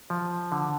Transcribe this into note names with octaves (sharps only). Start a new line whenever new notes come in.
F3
D3